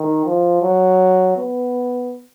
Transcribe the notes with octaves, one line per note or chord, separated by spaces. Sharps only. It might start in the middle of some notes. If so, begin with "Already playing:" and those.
Already playing: D#3
F3
F#3
B3